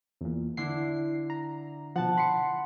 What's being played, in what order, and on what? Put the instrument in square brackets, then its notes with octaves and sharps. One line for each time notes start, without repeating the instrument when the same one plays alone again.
[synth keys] E2 A#2
[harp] D3 D4 E4 [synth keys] C7
[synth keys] A#5
[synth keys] B2 F3 [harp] F#5 A5
[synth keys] B5 [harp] C6 C#7